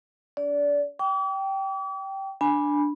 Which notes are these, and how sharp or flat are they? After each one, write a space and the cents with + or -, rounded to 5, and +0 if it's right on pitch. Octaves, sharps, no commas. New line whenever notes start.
D4 -40 D5 -20
G5 -10 D6 -40
D4 +0 G#5 +0 B5 -15